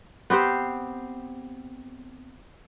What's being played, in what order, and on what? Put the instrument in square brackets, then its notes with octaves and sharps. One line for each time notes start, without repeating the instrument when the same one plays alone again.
[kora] B3 C4 G4 C5